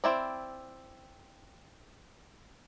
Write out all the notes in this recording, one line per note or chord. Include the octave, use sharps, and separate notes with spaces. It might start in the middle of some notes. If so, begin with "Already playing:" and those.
C4 E4 D5